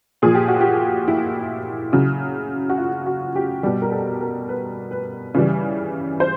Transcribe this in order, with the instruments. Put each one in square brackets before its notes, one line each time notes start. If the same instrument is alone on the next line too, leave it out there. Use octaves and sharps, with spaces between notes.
[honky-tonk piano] A#2 F3 G#4
G4
F#4
G4
E4
C#3 F#3
F#4
F4
F#4
G4
B2 G3 G4
A#4
A4
A#4
B4
B4
C#3 E3 G3
C5